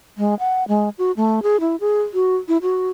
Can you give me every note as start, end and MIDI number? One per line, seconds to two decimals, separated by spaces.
0.18 0.35 56
0.39 0.64 78
0.68 0.89 56
0.98 1.12 66
1.17 1.43 57
1.43 1.60 68
1.60 1.76 64
1.80 2.01 68
2.14 2.36 66
2.48 2.57 64
2.62 2.89 66